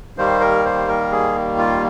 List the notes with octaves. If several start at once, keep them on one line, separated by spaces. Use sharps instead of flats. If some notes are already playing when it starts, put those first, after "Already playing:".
D#2 D#3 G3 A#3 C5
A#4
C5
A#4
G#4
F4